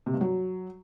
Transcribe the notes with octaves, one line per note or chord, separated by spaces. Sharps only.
C3
G2
F#3